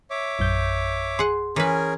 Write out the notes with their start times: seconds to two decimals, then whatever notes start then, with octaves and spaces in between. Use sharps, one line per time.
0.10 C#5 E5 D6
0.39 A#1 F#2 G6
1.19 G#4 F#5 C6
1.56 E3 C#4 G#4 A#4 B4